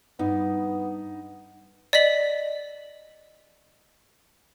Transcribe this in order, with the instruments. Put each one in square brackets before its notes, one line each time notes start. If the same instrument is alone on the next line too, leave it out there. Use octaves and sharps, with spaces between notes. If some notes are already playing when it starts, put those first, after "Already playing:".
[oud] G2 [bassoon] B3 [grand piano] D#4
[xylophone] D5 D#5 B6 F#7